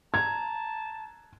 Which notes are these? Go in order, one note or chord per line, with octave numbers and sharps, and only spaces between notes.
A5 A#5 G#6